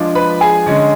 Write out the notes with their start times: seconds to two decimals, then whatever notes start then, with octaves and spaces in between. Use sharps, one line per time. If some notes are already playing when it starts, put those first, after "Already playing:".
Already playing: F3 G#3 D4
0.15 B4 B5
0.41 G#4 G#5
0.66 D3 G#3 C#4